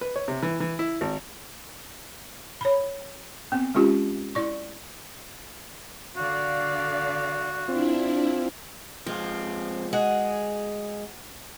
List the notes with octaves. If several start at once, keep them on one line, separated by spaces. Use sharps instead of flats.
B4
C#5
C3
E3
E3
E4
G#1
C#5 B5
B3 C4
G#3 C#4 F4 G4
E4 D5 C#6
D3 F#4 D5 F5
C4 D4 E4 F4
F3 G#3 C4 F4
G#3 F#4 G#4 F#5